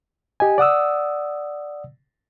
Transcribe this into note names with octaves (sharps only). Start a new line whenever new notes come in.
G4 D#5 G#5
D5 F#5 D#6 E6